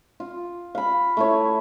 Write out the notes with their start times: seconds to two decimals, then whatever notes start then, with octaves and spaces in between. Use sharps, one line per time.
0.20 F4
0.75 F5 B5
1.17 A3 E4 C#5